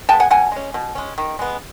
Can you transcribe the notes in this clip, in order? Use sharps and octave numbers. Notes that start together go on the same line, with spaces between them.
G#3 B3 G5 A5
F#5 G#5
B2 F#5 G#5
G#3 C#4
B2
G#3 C#4
D#3
G#3 B3